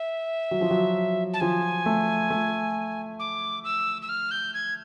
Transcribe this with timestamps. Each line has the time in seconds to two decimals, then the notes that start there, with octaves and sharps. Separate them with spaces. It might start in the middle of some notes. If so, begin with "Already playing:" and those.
Already playing: E5
0.51 F#3
0.61 F3
0.71 F#3
1.34 A5
1.40 F3 G#5
1.86 A3
2.30 A3
3.19 D6
3.64 E6
4.02 E6
4.09 F6
4.31 G6
4.54 G#6